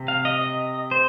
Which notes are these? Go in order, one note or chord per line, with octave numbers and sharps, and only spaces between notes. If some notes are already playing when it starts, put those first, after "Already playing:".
Already playing: C3
F5
D#5
D#5
C5